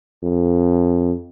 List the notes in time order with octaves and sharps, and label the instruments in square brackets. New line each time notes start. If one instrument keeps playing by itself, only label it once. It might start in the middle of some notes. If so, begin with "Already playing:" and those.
[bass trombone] F2